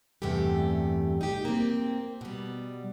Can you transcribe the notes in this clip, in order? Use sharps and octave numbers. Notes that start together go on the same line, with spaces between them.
E2 G2 C3 A3 G4
D#4 G4
A#3 C4
B2 G3